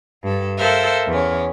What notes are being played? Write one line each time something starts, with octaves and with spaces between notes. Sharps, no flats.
G2 A4
A4 A#4 C5 E5 F5
E2 C#4